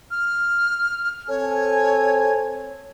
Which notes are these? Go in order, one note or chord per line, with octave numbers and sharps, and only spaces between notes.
F6
C4 A4 C#5 G#5